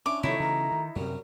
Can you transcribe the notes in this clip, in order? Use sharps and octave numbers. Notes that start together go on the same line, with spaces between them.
C#4 D4 E4 D6
C3 D#3 F3 F#3 A3 D#4 E4 C#5
C#3 E3 A#5
D#3
F#2 C3 F#3 G3 A#4